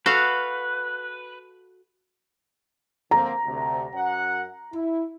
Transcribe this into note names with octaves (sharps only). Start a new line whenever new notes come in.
F#4 A4 B4 F5
D3 A#3 C4 A#5
D2 C3
F#2 F#5
E4